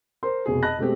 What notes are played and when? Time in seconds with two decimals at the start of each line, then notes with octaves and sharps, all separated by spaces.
0.23 A#4 C5 C6
0.46 F1 B2 G#4
0.63 D#5 A5 B5 F#6 A#6
0.78 B2 G#3 A3 C4 G4